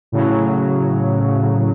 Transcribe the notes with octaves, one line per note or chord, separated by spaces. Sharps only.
A2 C#3 F#3